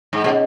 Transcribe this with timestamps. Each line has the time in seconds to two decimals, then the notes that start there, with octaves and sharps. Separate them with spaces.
0.13 G#2
0.24 B2 C#4 G#4 C#5 F#5